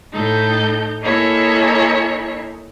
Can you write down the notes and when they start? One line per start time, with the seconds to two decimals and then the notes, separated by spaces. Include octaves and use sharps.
0.12 A2 D#4 A4 G6
1.02 A#3 D#4 E4 A4 C#5 G#5